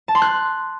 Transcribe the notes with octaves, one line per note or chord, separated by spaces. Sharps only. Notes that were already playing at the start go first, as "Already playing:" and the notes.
A5
C6
F#6